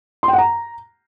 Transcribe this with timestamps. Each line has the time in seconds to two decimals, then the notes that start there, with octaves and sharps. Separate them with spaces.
0.23 C6
0.28 G5
0.33 F#5
0.38 A#5